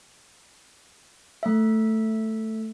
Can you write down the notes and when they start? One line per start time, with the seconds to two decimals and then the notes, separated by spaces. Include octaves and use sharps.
1.43 A3 E5